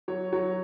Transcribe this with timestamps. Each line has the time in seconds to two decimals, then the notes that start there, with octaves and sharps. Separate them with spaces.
0.08 F#3 C#5
0.33 F#3 C#5